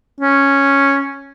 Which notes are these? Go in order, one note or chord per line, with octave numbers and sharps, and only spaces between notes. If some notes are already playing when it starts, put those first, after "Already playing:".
C#4